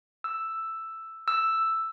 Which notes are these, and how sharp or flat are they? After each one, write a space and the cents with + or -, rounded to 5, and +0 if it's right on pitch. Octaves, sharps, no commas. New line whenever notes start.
E6 +5
E6 +5